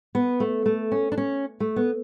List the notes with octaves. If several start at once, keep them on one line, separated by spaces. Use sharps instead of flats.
B3
A3
A3
C#4
D4
C#4
A3
B3